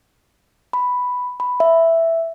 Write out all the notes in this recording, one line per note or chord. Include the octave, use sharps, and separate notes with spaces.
B5
B5
E5